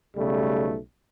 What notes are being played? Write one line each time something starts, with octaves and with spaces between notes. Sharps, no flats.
B1 C#3 G3 A3